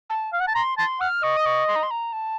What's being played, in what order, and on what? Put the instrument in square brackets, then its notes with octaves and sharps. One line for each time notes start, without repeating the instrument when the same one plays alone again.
[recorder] A5
[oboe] F5
F#5
A5
[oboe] A#5 [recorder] C6
[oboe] A5 [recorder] C6
[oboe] F#5 [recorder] F6
[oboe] D#5 [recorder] C#6
[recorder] D#6
C#6
C6
A#5
C6
A#5
A5